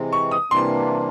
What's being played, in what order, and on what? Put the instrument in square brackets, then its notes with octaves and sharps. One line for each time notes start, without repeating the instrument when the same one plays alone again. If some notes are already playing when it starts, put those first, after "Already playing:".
Already playing: [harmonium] C3 E3 G#3 C4
[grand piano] C#6
D#6
[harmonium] C3 E3 G3 A#3 D4 [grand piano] C6